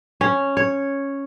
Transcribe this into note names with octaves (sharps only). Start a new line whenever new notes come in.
C#4
C#5